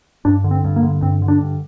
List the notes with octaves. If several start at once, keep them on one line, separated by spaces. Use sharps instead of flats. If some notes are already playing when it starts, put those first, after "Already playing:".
G2 D4
D3
C4
G2
A#3
D3
G2 C4
D3
D4
G2